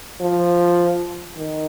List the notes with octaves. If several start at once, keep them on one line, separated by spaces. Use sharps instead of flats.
F3
D#3